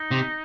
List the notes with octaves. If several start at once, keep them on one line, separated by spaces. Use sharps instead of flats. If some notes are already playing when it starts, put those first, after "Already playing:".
Already playing: D#4
C3